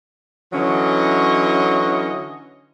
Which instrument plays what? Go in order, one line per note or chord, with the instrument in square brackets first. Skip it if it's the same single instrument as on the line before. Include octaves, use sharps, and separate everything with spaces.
[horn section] D3 E3 F#3 C#4 C#5 D#5